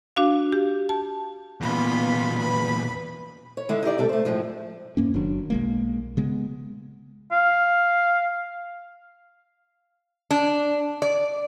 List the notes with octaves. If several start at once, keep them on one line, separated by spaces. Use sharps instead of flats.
D4 F#4 F5
G4
A5
E2 A#2 B3 F4 B5
B4 B5
C#5
D3 D#3 G#3 E4
D#4 E4 G4 D5
D2 C3 G3 A4
A3 C5
F#2 A2 F3 G#3
G2 A#3 C#4
F#1 D#3 F#3 D4
B1 G#3 A#3
C#3 G#3 B3
F5
D4
D5